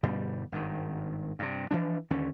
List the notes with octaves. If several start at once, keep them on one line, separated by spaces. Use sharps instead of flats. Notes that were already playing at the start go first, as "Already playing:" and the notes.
G2 B2 D3 G3
G#1 G2 D#3
G2 C3
E3 F3 D4
D#2 D3 C#4